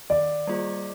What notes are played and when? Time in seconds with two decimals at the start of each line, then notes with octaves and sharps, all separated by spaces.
0.10 D#3 D5
0.47 G3 A#3 F4 G#4